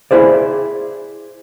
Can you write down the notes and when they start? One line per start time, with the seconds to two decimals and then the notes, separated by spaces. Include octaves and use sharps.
0.11 E4 G#4 C5 D5